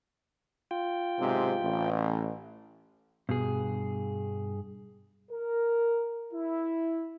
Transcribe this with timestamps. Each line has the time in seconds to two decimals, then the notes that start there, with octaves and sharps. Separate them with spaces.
0.71 F4 G5
1.19 B1 G#2 C3
1.62 A1
3.29 G2 B2 G#4
5.31 A#4
6.33 E4